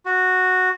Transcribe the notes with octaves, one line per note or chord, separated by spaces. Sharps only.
F#4